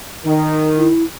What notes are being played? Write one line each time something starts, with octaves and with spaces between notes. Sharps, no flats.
D#3
E4